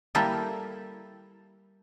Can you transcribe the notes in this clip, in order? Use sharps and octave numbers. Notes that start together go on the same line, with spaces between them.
G3 A#3 E4 G4 A4 A#4